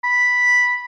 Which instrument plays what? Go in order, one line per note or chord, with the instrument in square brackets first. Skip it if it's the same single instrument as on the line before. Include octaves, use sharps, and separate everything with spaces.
[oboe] B5